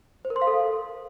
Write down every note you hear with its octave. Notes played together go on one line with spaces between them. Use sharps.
C5
A#4
C6
F5
A4